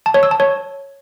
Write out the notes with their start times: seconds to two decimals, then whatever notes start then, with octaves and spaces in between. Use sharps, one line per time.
0.06 A5
0.14 C#5
0.23 E6
0.31 A5
0.40 C#5